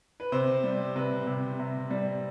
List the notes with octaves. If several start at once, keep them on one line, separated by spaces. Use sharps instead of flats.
B4
C3 C5
G3
C3 B4
C3
C3
G3